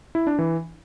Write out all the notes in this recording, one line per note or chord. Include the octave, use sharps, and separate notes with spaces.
E4
D4
E3